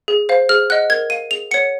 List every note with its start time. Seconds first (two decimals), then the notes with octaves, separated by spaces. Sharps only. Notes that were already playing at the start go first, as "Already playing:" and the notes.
0.08 G#4
0.29 C5 F5
0.49 G#4 F6
0.70 D#5 F#5 F#6
0.90 A#4 G#6
1.10 F5 D#7
1.31 G#4 F7
1.51 C#5 F#5 C#7